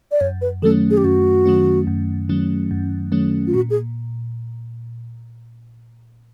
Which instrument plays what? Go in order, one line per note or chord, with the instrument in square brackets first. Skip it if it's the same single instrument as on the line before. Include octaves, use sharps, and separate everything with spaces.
[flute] D5
[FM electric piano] F#2 [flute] C#5
[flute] B4
[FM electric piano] D#3 F#3 A3 C#4 [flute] A4
[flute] G#4
G4
[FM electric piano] F#2 [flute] F#4
[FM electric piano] D#3 F#3 A3 C#4
F#2
D#3 F#3 A3 C#4
F#2
D#3 F#3 A3 C#4
[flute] F4
[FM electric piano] A#2 [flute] F#4
[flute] G#4